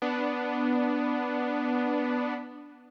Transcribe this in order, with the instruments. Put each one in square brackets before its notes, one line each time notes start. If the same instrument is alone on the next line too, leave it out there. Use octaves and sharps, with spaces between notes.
[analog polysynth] B3 D4